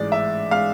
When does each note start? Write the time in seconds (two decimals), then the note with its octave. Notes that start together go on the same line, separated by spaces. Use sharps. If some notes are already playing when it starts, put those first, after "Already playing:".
Already playing: A1 G#2 G#3 D5
0.12 E5
0.51 G#3 F5